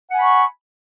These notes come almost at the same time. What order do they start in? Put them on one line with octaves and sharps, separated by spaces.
F#5 G#5 B5 C#6